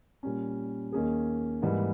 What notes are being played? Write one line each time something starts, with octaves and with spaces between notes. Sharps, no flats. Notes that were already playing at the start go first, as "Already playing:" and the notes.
A#2 G3 C#4
D#2 D#3 A#3 C#4 G#4
G#2 E3 G3 A#3